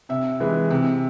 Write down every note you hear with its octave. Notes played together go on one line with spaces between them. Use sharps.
C3 E5
E3 G#3
C3